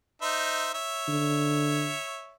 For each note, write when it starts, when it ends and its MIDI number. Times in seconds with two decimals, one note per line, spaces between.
0.22 0.73 63
0.22 0.73 72
0.22 0.73 76
0.74 2.36 73
0.74 2.36 76
1.08 1.94 50